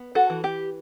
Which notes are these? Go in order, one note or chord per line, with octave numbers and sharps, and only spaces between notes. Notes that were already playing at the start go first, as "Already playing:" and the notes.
Already playing: B3
F#4 A4
E3
G4